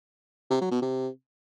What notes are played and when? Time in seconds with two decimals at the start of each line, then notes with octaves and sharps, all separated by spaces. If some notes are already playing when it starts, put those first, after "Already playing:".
0.51 C3
0.61 F#3
0.71 B2
0.82 C3